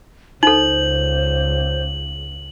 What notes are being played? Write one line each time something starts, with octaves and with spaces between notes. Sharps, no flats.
C#2 D#4 A4 C5 F#7